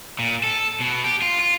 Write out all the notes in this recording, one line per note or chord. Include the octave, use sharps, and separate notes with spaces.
A#2
A4
B2
G4
F4
F4